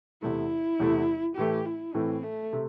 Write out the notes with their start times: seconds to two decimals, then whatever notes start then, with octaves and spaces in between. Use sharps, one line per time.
0.22 E2 C3 A3 E4
0.80 E2 C3 A3
1.36 A2 E3 A3 G4
1.65 E4
1.94 A2 E3 A3 C4
2.23 A3
2.53 C3 A3